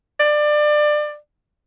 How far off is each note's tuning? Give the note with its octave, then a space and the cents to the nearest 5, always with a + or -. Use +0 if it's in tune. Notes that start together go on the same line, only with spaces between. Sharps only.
D5 +25